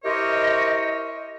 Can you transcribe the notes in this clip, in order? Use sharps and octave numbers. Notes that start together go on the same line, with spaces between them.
E4 G4 A#4 C5 C#5 D#5